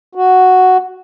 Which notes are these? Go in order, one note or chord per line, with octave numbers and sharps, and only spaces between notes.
F#4